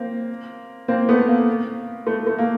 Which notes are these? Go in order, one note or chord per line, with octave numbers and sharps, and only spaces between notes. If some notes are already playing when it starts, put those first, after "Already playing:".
Already playing: A#3 C4
A#3 C4
A3 B3
A#3
A3
A3
A#3